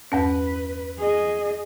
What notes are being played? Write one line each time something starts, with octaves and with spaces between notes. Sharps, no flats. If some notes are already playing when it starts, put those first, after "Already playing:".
E2 G2 C#4 B4
G#4 D#5